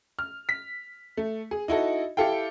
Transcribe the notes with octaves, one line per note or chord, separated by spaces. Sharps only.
F6
B6
A3
G#4
D#4 E4 F#4 A4
E4 G4 A4 F5 G5